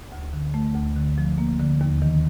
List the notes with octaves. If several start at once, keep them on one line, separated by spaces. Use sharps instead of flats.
D2
D3
A3
D2
D3
F3
A#3
D3
D#2
D#3